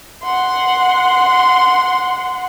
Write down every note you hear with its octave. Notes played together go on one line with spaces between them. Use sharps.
F#5 C6